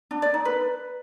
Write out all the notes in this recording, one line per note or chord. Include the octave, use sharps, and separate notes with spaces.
D4
D5
D#4
B4